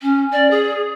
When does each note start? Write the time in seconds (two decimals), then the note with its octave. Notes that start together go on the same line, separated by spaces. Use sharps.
0.02 C#4
0.32 D5
0.51 G#4